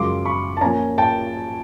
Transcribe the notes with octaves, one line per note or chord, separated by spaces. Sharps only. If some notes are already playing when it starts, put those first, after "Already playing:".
Already playing: F#2 C#3 F3 G#3 C6 D6
B5 C#6
A5
A#2 F3 A#3 C#4 G#5 A#5
G5 A5